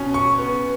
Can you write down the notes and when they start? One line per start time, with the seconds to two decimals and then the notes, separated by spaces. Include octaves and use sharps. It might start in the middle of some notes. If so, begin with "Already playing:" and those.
Already playing: B2 C#4
0.14 C#6
0.38 B3